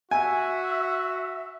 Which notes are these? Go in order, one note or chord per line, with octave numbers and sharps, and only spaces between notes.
F#4 E5 G#5